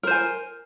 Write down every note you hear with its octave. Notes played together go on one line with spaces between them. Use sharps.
A#4 C5 G#5